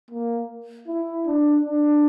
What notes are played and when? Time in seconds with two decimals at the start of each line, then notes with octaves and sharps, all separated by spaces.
0.11 A#3
0.88 E4
1.27 D4
1.65 D4